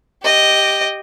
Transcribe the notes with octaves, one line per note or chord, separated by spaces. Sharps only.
G4 D#5